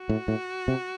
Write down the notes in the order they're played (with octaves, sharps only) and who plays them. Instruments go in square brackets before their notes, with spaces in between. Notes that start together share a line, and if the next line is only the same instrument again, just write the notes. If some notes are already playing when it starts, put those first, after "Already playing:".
Already playing: [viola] F#4
[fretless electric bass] A2
A2
C3